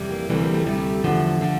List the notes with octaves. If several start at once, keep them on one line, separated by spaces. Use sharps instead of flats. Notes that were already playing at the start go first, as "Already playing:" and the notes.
Already playing: F2 C3 E3 G3
A#3
D2 C3 E3 G3 A3 C4
A#3
A3
D2 C3 G3 A3
E2 D3 F3
D3 F3